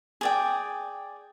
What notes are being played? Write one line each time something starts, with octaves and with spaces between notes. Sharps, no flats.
G#4 D5 G5